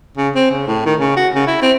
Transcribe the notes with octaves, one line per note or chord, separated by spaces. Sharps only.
C#3
C4
C#3
A2
D#3
C#3
F#4
C#3
E4
C4